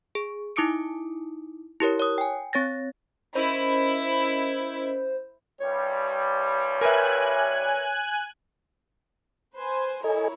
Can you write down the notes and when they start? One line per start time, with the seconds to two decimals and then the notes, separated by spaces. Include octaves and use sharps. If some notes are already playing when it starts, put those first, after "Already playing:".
0.15 G#4
0.56 D#4 E4 D6 D#6 C#7 D7
1.80 E4 G4 A#4 C#5
2.00 C#5 D#6
2.18 G5 G#5
2.53 C4 C#5 A6 A#6
3.35 C#4 E4 A#4 C5 D#5
5.61 C2 G2 G3 C#5
6.81 A#4 B4 E5 G#5 F#6
9.56 B4 C5 G#5
10.04 E4 A4 A#4 C#5 D#5 G#5